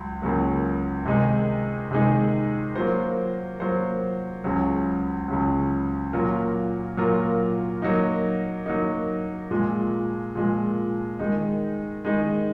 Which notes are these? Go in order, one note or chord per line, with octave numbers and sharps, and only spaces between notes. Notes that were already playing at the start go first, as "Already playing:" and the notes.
Already playing: C#2 F#3
C#2 C#3 F#3 A#3
C3 D#3 G#3 D#4 G#4
C3 D#3 G#3 D#4 G#4
F#3 A#3 F4 C5
F#3 A#3 F4 C5
C#2 C#3 F#3
C#2 C#3 F#3
A#2 F#3 A#3 F4 A#4
A#2 F#3 A#3 F4 A#4
F#3 A#3 D#4
F#3 A#3 D#4
A#2 F3 G#3
A#2 F3 G#3
D#3 G#3 D#4
D#3 G#3 D#4